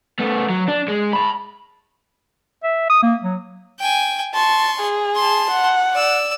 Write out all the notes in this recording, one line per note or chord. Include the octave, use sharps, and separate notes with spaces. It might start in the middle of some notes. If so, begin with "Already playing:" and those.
A3 B3
F#3
D4
G#3
A5 B5
E5
D#6
A#3
F#3
G5 G#5
A5 C6 C#6
G#4
A5 C6
F#5
D5 E6